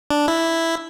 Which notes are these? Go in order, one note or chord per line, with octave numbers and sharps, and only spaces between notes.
D4
E4